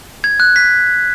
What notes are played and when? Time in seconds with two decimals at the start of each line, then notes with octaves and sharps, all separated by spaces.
0.24 G#6
0.40 F#6
0.56 B6